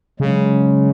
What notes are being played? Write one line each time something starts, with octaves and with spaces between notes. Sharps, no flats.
C#3 F#3 G#3